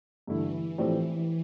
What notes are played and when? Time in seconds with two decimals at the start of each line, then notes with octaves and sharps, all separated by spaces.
0.27 G2 D3 E3 A3 E4
0.78 A2 F3 C4 G4 D5